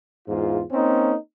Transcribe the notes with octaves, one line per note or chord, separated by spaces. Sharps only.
E2 G#2 F4
A#3 C4 C#4 D#4